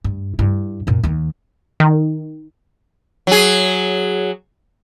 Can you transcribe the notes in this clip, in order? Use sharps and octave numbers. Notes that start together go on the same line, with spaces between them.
G2
G2 E4
F#2 A#2
D#2 D#3
D#3
F#3 G#4